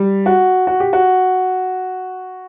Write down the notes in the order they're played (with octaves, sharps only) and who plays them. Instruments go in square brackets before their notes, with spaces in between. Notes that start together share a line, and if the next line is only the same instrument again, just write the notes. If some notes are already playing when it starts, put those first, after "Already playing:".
Already playing: [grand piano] G3
F#4
F#4
G4
F#4